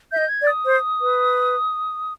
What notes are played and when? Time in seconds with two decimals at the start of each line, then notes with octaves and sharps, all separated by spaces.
0.12 E5 G6
0.17 D#5
0.29 G#6
0.42 D5
0.47 D#6
0.65 C5
1.01 B4